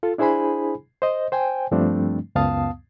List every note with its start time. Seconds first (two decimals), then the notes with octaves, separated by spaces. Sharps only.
0.03 F4 A4
0.18 D4 E4 G#4 C5 G#5 B5
1.02 C5 D#5
1.32 C5 G5 G#5
1.71 G2 F3 G3 A3 C4 D4
2.35 C#2 F#2 B3 F5 A5 D#6